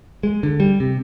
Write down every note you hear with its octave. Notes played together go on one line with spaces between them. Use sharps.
G#3
D3
G3
C3